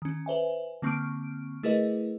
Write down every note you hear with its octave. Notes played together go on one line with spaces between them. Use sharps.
D#3 C#4
B4 C5 E5 G#5
D3 A#3 C4 C#6 F6 D7
A3 E4 G#4 A#4 B4 D#5